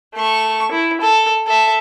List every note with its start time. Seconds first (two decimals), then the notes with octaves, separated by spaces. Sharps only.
0.15 A3 C#6
0.71 E4
1.01 A4
1.47 A4 E5